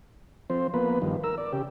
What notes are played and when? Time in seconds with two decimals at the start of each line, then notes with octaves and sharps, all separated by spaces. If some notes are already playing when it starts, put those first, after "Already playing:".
0.50 F3 C4 C5
0.74 F3 A#3 B3 B4
1.02 G2 D#3 F3
1.24 A#4 E6
1.38 D5
1.53 C#3 G4